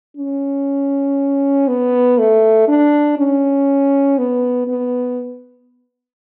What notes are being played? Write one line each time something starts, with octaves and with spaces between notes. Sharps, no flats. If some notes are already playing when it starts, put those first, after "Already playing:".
C#4
B3
A3
D4
C#4
B3
B3